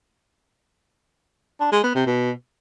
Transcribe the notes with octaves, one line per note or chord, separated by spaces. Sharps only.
D4
G#3
B3
C3
B2